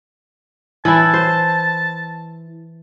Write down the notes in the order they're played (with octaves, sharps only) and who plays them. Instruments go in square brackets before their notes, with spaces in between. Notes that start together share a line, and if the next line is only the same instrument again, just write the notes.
[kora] E3 E4 [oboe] A5
[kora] C5